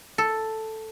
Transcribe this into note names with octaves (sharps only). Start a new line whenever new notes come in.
A4